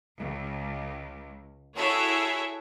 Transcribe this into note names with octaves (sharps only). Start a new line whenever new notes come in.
C#2
E4 F#4 G#4 A4 C#5 E5